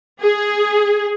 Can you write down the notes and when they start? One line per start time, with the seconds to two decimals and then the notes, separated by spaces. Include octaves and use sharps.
0.21 G#4